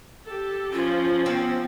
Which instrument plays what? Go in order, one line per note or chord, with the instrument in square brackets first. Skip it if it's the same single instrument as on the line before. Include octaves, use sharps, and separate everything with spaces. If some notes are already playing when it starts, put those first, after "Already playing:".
[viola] G4 A4
[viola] F3 C#4 [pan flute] F4
[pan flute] B3 [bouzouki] C4